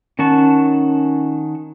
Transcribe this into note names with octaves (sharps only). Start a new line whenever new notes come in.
D#3 C#4 F#5 A5 C#6